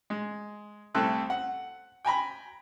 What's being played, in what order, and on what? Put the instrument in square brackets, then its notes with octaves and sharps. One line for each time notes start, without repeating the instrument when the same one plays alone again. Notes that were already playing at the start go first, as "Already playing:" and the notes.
[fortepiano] G#3
C2 A3 C4 A4 F#6
F#5
G5 G#5 A#5 B5